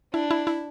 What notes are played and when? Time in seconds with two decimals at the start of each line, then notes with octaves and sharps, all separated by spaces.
0.13 D4 E4
0.31 E4
0.47 E4